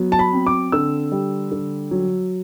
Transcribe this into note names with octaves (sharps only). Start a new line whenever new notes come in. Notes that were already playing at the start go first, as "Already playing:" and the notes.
Already playing: F#3 B3
A5
B5
C4
D6
D3 E6
G3
D3
F#3